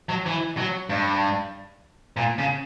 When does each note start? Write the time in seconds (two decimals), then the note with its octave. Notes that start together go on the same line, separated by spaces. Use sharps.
0.09 F#3
0.26 E3
0.57 F#3
0.89 G2
2.17 A#2
2.38 C#3